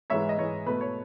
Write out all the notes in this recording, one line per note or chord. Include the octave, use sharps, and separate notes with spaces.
G#2 E3 G#3 C#5 E5
D#5
G#2 E3 G#3 C#5
B2 A3 B4
C#5